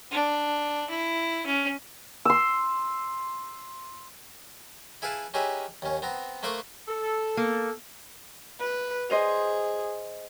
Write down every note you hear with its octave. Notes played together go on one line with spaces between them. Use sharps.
D4
E4
C#4
C6 E6
E4 G#4 B4 F5 A5
C#4 D#4 G4 G#4 B4 E5
D#2 C#4
B3 C4 A#5
A3 A#3 B4 C5 C#6 D6
A4
A#3
B4
G#4 C5 D#5